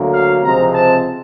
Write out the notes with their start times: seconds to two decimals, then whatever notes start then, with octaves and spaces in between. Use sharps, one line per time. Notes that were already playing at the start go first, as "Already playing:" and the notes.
Already playing: D2 D3 F#3 A#3
0.11 F5
0.41 C#2 C3 F3 G#3 C4 A#5
0.73 A5